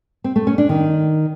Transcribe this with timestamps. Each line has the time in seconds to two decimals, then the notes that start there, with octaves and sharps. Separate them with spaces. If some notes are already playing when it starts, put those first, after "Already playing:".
0.24 C4
0.36 A3
0.47 C#4
0.58 D4
0.69 D#3